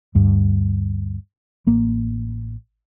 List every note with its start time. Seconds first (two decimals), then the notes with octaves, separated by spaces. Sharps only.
0.15 D2 G2
1.67 A1 A#3